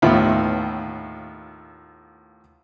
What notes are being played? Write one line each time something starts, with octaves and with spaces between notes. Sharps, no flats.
D#2 A2 B3 F4 E5 B5